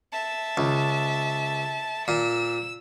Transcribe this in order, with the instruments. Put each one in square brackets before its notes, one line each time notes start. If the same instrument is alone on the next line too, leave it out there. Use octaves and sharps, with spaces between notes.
[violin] E5 A5
[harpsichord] C#2
[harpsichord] A#2 [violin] E6